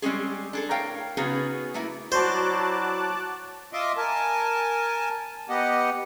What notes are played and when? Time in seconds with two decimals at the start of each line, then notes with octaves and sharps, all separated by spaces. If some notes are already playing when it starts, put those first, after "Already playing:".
0.02 G3 G#3 C4 C#4 G#4
0.53 D4 G#4 A4
0.70 A2 A#4 C#5 F5 G5
1.17 C#3 B3 C#4 D#4 F#4 G#4
1.74 A3 A#3 E4
2.12 F#3 D4 E4 F#4 C5 A5 D6 F#6
3.73 F4 D#5 E5 C6 D6
3.97 A#4 G#5 A5
5.49 B3 G4 D#5 F#5